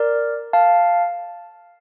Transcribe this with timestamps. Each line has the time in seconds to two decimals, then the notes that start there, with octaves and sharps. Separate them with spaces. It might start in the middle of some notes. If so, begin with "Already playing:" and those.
Already playing: A#4 D5
0.53 F5 A5